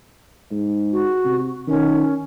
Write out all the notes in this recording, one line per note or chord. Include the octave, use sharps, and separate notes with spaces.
G#2
F#4
C3
D#3 C#4